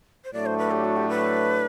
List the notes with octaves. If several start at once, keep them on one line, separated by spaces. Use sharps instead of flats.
C5
A2 F#3 A3 D4 D5
C5
B4
G4
F#4
G4
B4